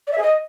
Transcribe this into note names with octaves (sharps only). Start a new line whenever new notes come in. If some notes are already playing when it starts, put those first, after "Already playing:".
D5
E5
G#4
D#5